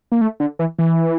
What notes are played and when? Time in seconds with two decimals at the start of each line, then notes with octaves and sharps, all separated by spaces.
0.12 A#3
0.21 A3
0.40 D3
0.59 E3
0.79 E3